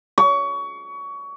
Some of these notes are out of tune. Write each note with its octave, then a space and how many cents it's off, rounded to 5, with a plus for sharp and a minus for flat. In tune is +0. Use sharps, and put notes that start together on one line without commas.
C#6 +25